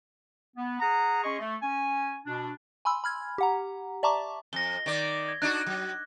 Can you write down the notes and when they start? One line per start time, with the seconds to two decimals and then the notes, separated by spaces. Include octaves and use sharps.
0.57 B3
0.80 G#4 F#5 A#5
1.24 C#4 G#4 D#5 C6 C#6
1.39 A3
1.62 C#4 G#5
2.26 B2 D4
2.85 G#5 B5 C6 E6
3.04 B5 F6 G#6
3.38 G4 F#5 A#5
4.03 D5 E5 A5 A#5 C#6 D6
4.53 F2 A#6 G7
4.86 D#3 D5
5.28 G#6
5.42 D4 D#4 F#4 F#6
5.66 F#3